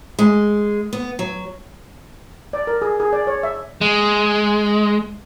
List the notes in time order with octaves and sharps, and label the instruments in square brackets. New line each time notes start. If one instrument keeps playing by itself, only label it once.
[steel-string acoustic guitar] G#3
B3
F#3
[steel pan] D5
A#4
G#4
G#4
D5
C#5
E5
[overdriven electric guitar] G#3